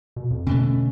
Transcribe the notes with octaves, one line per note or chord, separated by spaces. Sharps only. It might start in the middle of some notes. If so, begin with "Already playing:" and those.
B2
F2
B2 D3 A3 C#4